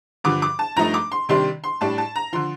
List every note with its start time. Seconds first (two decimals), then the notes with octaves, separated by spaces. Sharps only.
0.24 G2 D3 F3 D6
0.42 D6
0.59 A5
0.76 G2 F3 A3 D#4 A#5
0.94 D6
1.12 C6
1.29 C3 D#3 G3 D4 C6
1.64 C6
1.81 A2 G3 D4 A5
1.98 A5
2.16 A#5
2.33 D3 F3 C6